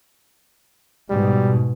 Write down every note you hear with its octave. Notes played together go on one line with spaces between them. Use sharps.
G#2 B2 G3